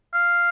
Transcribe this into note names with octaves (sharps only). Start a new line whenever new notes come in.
F5